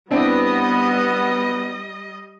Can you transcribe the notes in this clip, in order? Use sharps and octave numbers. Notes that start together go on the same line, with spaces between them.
G3 B3 C4 D4 E4 D#5